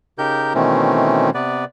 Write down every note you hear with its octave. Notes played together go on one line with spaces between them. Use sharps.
C#3 D#4 G4 A#4 G6
B2 D#3 E3 A3 C4 C#4
C3 B3 B4 D5